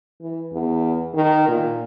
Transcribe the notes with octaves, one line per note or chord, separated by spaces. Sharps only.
E3
E2
D#3
A#2